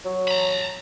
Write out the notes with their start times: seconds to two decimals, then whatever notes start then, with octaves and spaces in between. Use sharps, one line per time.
0.05 F#3
0.28 A#5 B5